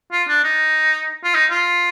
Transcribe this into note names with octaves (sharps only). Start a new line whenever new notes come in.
F4
D4
D#4
F4
D#4
F4